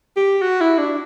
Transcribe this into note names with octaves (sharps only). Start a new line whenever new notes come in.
G4
F#4
E4
D4